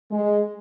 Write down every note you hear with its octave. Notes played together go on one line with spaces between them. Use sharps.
G#3